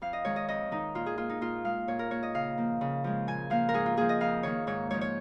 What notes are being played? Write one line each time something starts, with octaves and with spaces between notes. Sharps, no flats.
F2 F5
D#5
D#3 G#3 C#5
D#5
F2 D#5
D#3 G#3 D#4
A#2 F4
G#4
A#3 F4
D#4
A#2 F4
G#3 F5
A#2 C#5
A#4
A#3 C#5
D#5
C#3 F5
F3 A#3
C#3
F3 G#3
A#2 G#5
F3 A#3 F5
A#4
G#2 G#4
F4
F3 A#3 G#4
D#5
F2 F5
D#3 A#3 C#5
G#2 C#5
F3 G#3 C#5
C#5